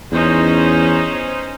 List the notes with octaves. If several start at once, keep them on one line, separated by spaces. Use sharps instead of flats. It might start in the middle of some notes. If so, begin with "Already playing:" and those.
E2 C#4 D#4 C5